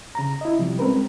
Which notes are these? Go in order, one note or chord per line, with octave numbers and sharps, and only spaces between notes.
C#3 A#5
E4 D#5
C3 F3 G3
G#3 C4 C#4 A#4 B4